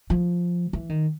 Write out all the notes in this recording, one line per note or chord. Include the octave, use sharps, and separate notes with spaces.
F3
E3
D#3